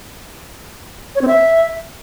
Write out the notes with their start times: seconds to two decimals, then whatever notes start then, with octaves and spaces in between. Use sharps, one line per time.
1.15 C#5
1.21 C4
1.28 E5